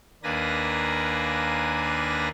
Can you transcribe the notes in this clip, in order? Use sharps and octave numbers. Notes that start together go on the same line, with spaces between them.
D#2 A#3 D4 B4 G#5 A#6